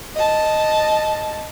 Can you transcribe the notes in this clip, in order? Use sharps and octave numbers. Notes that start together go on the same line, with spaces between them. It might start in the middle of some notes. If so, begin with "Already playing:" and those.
D#5 A5